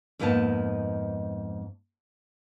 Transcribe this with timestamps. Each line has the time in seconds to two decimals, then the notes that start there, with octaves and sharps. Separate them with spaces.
0.19 F2 G#2 A#3 B3 D#4 A5